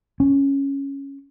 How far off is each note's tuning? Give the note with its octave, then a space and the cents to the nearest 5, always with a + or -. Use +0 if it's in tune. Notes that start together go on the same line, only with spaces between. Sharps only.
C#4 -5